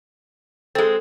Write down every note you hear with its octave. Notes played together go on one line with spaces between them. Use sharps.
G#3 C4 A4